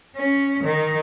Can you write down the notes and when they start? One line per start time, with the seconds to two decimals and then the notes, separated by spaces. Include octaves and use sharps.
0.17 C#4
0.64 D#3